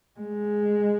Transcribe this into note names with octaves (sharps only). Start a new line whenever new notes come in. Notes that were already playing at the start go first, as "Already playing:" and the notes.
G#3